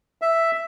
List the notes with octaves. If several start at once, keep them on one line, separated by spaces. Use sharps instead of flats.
E5